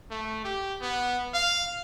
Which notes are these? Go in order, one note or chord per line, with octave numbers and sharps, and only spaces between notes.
A3
G4
B3
F5